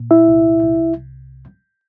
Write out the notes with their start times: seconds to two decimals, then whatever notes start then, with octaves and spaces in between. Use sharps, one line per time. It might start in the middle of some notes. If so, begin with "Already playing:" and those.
Already playing: A#2
0.11 E4 E5
0.28 C2
0.63 C2